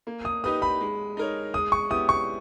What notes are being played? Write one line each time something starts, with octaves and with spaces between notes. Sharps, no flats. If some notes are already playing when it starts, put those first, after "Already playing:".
A#3
D#6
D#4 G4 B4 D#6
B5
G#3
D#4 A#4 C#5
G#3 D#6
C#6
B3 E4 G4 D#6
C#6